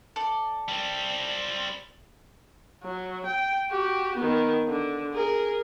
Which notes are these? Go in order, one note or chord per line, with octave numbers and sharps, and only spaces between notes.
A4 D5
G3 C4
F#3
G5
F#4 G4
D#3 B3
D3
G#4 A#4